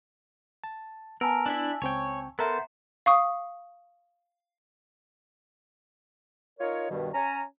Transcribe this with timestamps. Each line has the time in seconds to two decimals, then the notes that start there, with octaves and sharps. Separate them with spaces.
0.64 A5
1.21 B3 A#4 G#5 A5 E6
1.46 D4 E4 E5
1.82 C#2 C4 C#5 G5
2.39 B3 A4 A#4 C5 E5 A#5 A6
3.06 F5 C#6 D#6
6.60 D#4 F4 A#4 C#5
6.90 G2 B2 D#3 G3
7.14 C#4 G#5 A#5